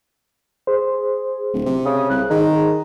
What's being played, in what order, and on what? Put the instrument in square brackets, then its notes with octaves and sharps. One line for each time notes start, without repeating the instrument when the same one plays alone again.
[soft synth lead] G#4 [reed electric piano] C5
[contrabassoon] D1
C3
[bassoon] C#3 [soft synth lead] D#6
[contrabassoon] C2 [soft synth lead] F#6
[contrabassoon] D#3 [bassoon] D#4 [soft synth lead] G#4